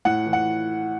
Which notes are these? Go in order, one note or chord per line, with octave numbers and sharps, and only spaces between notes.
A2 F#5
E3
F#5